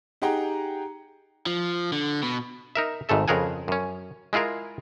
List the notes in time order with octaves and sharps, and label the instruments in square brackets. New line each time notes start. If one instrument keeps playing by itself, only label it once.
[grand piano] D#4 G4 G#4 F#5 G5 A#5
[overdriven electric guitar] F3
D3
B2
[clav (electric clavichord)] D#4 A#4 E5
G#1 G#2 A3 A4 E5
F2 C#3 G#4 A#4 F#5 G#5
F#2 C#4
G#3 E4 F4 G#4 A#4